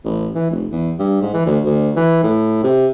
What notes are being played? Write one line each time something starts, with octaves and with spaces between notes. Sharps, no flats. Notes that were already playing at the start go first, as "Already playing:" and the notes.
A1
E3
F1
E2
G2
G#2
E3
D2
D2
E3
A2
C3